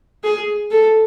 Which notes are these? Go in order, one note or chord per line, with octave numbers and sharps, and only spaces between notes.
G#4
A4